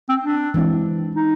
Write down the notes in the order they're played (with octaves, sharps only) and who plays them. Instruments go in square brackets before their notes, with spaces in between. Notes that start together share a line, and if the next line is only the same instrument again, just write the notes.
[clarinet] C4
D4
[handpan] E3 G#3 C4 E4
[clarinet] D#4